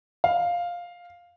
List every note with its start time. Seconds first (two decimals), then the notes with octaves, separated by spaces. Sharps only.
0.24 F5